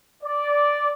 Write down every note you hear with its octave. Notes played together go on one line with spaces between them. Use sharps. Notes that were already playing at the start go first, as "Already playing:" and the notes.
D5